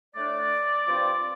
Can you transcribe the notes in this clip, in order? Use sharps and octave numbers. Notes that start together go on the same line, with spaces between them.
A2 A3 D4 D5
G2 F3 C4 F4